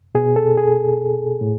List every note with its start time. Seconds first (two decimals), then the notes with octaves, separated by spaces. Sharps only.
0.15 B2 G#4
0.36 A4
0.58 G#4
1.41 A2